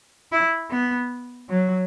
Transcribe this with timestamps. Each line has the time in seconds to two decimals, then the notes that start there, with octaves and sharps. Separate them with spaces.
0.32 E4
0.70 B3
1.49 F#3